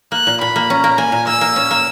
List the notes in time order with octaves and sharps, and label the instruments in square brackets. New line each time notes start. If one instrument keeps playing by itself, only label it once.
[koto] A#3 [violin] F#6
[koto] A#2
[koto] A#2 [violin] B5
[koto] A#3
[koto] C#4 [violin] A#5
[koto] A#3
[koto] A#3 [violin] G#5
[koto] A#2
[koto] A#3 [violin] E6
[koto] A#3
C#4
A#3